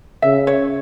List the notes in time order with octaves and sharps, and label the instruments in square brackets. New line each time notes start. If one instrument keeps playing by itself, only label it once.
[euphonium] C#3 [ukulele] E5
[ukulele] C#5